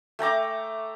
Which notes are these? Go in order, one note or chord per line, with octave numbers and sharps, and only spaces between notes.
A3 G5 A#5 D6